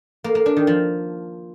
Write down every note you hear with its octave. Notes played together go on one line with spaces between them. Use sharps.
A#3
A#3
D4
D#3
F3